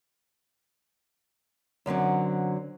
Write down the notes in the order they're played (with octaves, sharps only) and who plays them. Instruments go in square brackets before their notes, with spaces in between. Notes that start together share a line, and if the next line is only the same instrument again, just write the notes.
[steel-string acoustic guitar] F#2 D3 F#3 C4